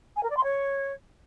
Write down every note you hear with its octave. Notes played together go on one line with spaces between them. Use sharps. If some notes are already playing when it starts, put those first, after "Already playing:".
G#5
A#4
D5
C6
C#5